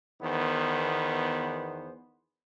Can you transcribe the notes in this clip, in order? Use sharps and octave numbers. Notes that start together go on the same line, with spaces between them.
E2 D#3 B3 C5